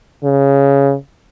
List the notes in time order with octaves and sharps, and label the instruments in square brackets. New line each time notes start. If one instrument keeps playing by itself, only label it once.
[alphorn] C#3